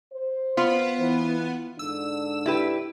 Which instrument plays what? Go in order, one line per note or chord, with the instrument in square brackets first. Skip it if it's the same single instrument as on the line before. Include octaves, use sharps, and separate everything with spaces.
[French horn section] C5
[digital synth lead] B3 [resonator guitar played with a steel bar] F4
[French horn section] E3
[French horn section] G#2 D3 D4 [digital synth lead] E6
[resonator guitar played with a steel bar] E4 G4 B4